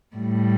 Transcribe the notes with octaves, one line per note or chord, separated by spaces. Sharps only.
A2 G3